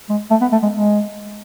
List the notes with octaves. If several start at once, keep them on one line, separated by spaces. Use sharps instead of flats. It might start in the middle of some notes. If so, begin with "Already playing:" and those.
G#3
A3
B3
A3
G#3
G#3